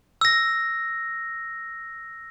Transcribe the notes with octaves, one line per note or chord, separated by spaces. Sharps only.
E6 A#6